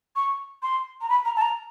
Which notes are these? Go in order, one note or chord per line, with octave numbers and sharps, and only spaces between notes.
C#6
C6
A#5
B5
A#5
A5
A#5